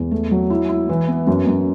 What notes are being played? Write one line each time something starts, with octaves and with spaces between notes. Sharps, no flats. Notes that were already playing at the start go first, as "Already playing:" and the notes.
Already playing: E2
A3
F#3
E4
E4
E3
B3
F#2
F#2